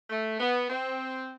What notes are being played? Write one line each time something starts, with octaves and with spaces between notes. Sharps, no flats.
A3
B3
C4